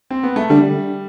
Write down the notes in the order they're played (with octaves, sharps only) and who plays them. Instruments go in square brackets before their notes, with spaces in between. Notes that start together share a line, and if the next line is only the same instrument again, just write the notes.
[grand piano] C4
B3
A3
[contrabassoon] D3 [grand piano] G3